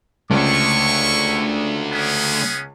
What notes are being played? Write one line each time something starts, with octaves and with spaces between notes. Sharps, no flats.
C#2 A3 D4 E4 C#6
B3 C#4 G#4